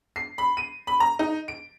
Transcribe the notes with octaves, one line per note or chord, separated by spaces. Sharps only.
C7
B5
D#7
B5
A#5
D#4
D7